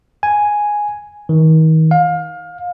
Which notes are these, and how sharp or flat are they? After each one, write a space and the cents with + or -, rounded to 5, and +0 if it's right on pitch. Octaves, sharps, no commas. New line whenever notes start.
G#5 +0
D#3 +35
F5 +25